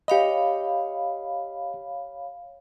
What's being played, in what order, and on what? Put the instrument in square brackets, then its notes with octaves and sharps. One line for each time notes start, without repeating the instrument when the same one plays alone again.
[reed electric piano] G4 D#5 [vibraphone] C#5 F5 B5